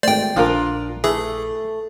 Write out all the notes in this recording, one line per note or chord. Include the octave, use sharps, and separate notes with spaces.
G#1 A3 C5 D5 G5
A#1 A#2 F3 D4 F4 A#4
E3 A3 G#4